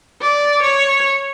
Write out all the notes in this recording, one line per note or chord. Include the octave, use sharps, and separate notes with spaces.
D5
C#5